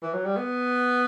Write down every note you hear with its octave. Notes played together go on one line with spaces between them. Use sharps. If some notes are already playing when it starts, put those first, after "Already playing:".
E3
F#3
G3
B3